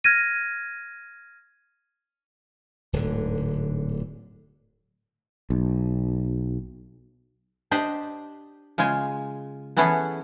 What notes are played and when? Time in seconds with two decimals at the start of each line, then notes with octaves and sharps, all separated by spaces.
0.04 F6 G#6 A#6 D#7
2.93 D1 G#2 D3
5.50 B1
7.71 D4 G4 C5 D#5
8.78 C#3 G#3 F4 G#5
9.77 E3 B3 C#4 E4 G#4 A4